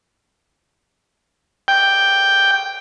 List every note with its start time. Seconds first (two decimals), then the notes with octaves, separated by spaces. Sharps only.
1.68 G5